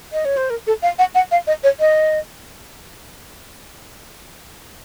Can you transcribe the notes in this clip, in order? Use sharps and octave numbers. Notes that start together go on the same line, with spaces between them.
D#5
C#5
C5
A#4
A4
F5
F#5
F#5
F5
D#5
C#5
D#5